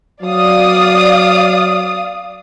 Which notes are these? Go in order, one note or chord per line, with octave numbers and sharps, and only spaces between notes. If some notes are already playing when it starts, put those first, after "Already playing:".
F#3 D5 F5 D#6